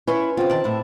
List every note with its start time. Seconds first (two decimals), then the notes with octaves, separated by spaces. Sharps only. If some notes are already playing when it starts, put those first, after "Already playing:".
0.07 C#4 E4 B4 C#5 C6
0.37 C#3 C4 F4
0.50 D#3 D5 A5
0.64 A2 E4